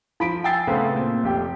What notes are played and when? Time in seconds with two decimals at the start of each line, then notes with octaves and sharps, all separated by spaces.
0.20 F3 B5 B6 D7
0.44 G5 G#5 E6 A6 C7
0.67 C#3 A3 B3 C4
0.94 A#2 C4
1.23 F1 G4 G5